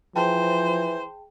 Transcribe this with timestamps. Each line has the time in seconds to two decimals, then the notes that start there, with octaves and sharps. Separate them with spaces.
0.16 E3 F3 G#4 C5 G5 A5